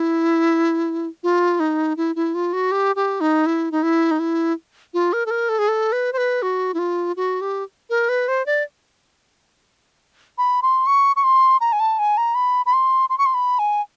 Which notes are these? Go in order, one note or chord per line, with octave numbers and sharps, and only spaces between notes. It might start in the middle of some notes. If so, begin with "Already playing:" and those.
Already playing: E4
F4
D#4
E4
E4
F4
F#4
G4
G4
D#4
E4
D#4
E4
D#4
E4
F4
A#4
A4
A#4
A4
G#4
A4
B4
C5
B4
F#4
E4
F4
F#4
G4
A#4
B4
C5
D5
B5
C6
C#6
C#6
C6
A#5
G#5
A5
G#5
A#5
B5
B5
C6
C6
C#6
C6
B5
G#5